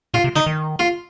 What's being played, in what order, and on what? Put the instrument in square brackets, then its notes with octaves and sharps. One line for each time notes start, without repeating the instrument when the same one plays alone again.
[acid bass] A#2 [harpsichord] F4
[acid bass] C3
[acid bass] D3 [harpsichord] D#4
[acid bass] D#3
[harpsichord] F4